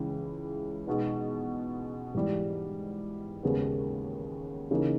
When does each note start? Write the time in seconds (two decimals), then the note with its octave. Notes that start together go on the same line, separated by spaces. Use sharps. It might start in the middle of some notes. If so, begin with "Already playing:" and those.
Already playing: C#2 C#3 E3
0.87 B2 G#3 B3 D#4
2.14 G#2 E3 G3
3.43 D#2 C#3 G#3 B3
4.71 C#3 E3 A#3 D#4